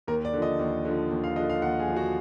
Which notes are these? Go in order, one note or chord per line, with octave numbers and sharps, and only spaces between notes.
D#2 A#4
D5
D3 F3
D#5
D#2
D3 F3
D#2
F5
D3 F3 D#5
F5
D#2 F#5
G#4
D3 F3
F#4